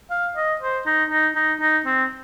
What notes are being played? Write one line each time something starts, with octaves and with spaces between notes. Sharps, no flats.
F5
D#5
C5
D#4
D#4
D#4
D#4
C4